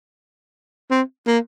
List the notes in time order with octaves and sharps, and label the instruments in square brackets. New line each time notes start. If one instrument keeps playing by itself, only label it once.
[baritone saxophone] C4
A#3